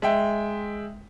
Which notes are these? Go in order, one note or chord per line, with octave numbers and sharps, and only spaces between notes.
G#3 E5 G5